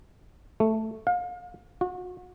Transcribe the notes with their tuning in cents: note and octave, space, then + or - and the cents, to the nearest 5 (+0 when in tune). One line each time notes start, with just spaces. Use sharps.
A3 +0
F5 +35
F#4 -35